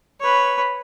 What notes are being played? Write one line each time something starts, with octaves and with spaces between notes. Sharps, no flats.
B4 C#5